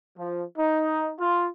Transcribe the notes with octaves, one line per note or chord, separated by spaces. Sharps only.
F3
D#4
F4